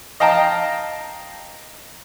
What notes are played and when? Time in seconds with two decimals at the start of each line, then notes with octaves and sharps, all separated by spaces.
0.20 D#5 F5 G5 A5 A#5